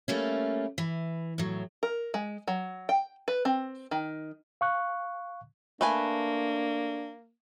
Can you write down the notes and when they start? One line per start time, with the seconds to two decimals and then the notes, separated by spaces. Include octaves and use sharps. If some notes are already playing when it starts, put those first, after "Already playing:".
0.08 G3 A3 A#3 C#4
0.78 E3
1.38 A2 F#3
1.83 A#4
2.14 G#3
2.48 F#3
2.89 G5
3.28 B4
3.45 C4
3.91 D#3
4.61 F5 C#6 F#6
5.81 A3 A#3 D4 B4 G#5